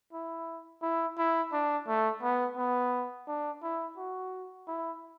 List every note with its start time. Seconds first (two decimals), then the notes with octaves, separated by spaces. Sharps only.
0.13 E4
0.82 E4
1.18 E4
1.52 D4
1.87 A3
2.22 B3
2.57 B3
3.27 D4
3.63 E4
3.97 F#4
4.67 E4